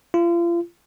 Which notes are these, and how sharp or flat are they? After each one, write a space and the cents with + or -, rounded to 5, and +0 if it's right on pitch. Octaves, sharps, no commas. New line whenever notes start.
F4 -35